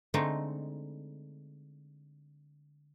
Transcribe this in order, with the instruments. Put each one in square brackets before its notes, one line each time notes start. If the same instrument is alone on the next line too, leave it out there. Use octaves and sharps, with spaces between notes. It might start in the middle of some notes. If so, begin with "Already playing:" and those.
[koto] D3 G#3 A3 C4 D#4